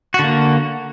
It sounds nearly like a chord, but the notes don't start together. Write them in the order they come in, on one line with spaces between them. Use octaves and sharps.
F#4 D3 A#3